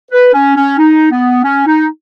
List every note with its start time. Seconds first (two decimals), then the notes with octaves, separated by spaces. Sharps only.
0.11 B4
0.33 C#4
0.55 C#4
0.78 D#4
1.11 B3
1.44 C#4
1.66 D#4